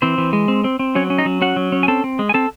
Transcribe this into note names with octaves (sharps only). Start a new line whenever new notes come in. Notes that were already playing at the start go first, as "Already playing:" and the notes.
E3 C4 C5
E3
G#3
C4
C4
C4
F#3 C#4 C#5
C#4
D#4 D#5
F#3
C#4 F#4 F#5
F#3
C#4
G#5
C4 A4 A5
C4
G#3
G#5
C4 A4 A5